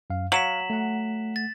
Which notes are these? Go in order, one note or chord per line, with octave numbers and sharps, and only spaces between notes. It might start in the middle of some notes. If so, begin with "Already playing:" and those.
F#2 F5
F#3 F5 F#5 B6 E7 F#7
A3 F#5
A6